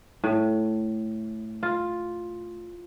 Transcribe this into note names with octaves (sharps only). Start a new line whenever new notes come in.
A2
F4